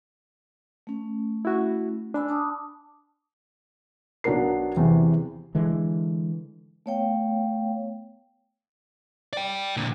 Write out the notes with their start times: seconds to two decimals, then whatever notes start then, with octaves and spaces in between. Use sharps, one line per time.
0.87 A3 C#4
1.45 E4 F#4
2.14 D4 G#5 B5 E6
2.29 A5 D6 D#6
4.24 B1 F#3 B3 D4 A#4 C7
4.76 E2 C3 E3
5.55 D3 E3 G#3
6.86 A3 B3 C#5 F5 G5
9.33 D5 G5
9.77 A#2 D3